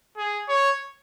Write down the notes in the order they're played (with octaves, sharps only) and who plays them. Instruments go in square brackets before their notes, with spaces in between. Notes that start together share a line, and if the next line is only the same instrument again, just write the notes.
[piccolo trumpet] G#4
C#5